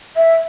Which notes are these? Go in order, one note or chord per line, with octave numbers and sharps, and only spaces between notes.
E5